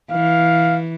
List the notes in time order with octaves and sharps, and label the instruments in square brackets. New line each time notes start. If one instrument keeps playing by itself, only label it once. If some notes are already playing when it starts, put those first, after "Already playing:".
[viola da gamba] E3 [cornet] F5